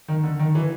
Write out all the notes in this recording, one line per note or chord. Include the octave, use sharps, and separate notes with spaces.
D#3
D3
D#3
E3